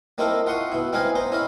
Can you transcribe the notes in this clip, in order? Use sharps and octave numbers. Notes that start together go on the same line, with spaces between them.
A#3 C4 D#4 E4 A4 A#4
F4 F#5 C6 C#6 D#6
B2 E4
C4 D#4 B4 D#5 F5 G#5
B3 C5 A#5
C#4 E4 D#5 F5 B5